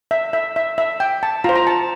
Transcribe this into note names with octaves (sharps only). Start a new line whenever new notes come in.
E5
E5
E5
E5
G5
A5
F4 C5 A#5
A#5
A5